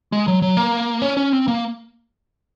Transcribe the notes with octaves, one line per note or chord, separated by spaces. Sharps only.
G#3
F#3
F#3
A#3
C#4
C#4
C4
A#3